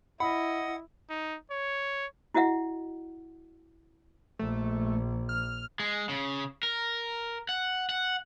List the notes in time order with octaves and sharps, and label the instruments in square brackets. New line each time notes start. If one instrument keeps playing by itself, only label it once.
[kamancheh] E4 [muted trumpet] D#5 [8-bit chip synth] F#5 [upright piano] B5
[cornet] D#4
C#5
[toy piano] E4 F#4 D#5 E5 F#5
[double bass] A#1 [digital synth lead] A3
[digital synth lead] F6
[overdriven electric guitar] G#3
C#3
A#4
F#5
F#5